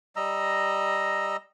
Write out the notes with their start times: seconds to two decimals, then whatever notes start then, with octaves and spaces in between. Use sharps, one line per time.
0.16 G3 D#5 A#5 E6